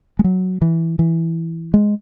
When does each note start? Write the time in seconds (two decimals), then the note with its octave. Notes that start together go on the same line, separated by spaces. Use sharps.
0.19 G#3
0.24 F#3
0.62 E3
0.99 E3
1.74 G#3